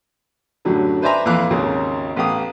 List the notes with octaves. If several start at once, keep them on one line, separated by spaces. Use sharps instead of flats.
F#2 A2 D3 F#3 G3
B4 C5 D5 E5 G#5 A#5
F2 A#2 E3 F5 D6 F#6
G#1 D#2 C#3 A#3
A1 B3 F5 G5 D#6